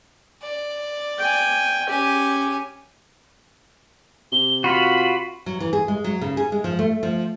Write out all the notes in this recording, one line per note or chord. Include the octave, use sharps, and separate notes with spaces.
D5
G5 G#5
C#4 G4 G#5
C3 G7
F4 F#4 B5
F#3
E3
G#4
G#3
F#3
C#3
G#4
G#3
F3
A3
F3